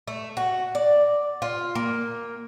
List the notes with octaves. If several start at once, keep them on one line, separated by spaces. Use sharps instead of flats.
A3
F#4
D5
F4
A#3